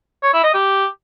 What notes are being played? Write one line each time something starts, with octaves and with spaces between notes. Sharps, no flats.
C#5
E4
D#5
G4